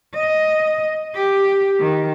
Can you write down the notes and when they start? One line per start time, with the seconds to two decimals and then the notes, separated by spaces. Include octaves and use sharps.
0.14 D#5
1.15 G4
1.80 D#3